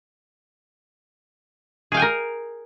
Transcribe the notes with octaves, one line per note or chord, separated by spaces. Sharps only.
G#4 A#4 F5 G5 G#5